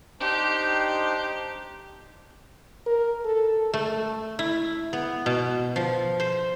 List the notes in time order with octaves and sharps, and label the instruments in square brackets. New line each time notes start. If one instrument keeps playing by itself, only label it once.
[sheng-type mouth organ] D4 D#4 C5 [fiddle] G4
[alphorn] A#4
A4
[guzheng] A3
E4
B3
B2
F3
C5